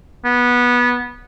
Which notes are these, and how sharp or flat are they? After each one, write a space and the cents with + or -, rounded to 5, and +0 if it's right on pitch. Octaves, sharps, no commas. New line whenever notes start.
B3 -15